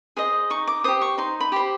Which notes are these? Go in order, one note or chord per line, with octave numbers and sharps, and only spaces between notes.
G#4 C5 D#5
D#4 C#6
D6
G4 C5 D#6
C#6
D#4 C6
B5
G4 C5